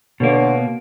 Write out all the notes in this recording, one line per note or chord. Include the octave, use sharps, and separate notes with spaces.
B2 D3 A#3 B3 C#5